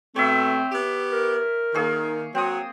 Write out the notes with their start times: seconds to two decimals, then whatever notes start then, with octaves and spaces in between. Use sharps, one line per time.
0.16 B2 A3 C4 C#5 E5
0.72 B3 G4
1.12 A#4
1.74 D#3 A#3 G#4 C#5
2.35 F#3 C4 D#6